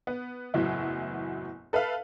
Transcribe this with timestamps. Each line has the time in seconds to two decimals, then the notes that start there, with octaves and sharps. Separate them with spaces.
0.07 B3
0.54 F#1 E2 A2 F#3 B3 E4
1.73 A4 B4 E5 F5